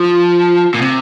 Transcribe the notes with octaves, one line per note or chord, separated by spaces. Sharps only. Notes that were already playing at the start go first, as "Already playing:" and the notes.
Already playing: F3
A#2
C3